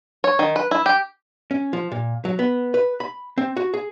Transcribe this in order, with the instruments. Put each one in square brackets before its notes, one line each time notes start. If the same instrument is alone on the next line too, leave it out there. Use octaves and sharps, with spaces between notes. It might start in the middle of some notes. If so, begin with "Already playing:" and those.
[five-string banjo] C#5
D#3
B4
E4
G4
[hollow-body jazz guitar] C#4
F3
A#2
F#3
B3
B4
B5
C4
F#4
G#4